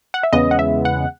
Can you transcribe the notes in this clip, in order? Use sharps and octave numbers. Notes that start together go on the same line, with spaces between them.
F#5
E5
E2 C#3 G#3 B3 D#5
F#5
E5
F#5